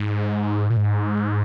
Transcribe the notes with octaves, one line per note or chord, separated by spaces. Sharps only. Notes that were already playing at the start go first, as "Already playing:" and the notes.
Already playing: G#2
A#2
G#2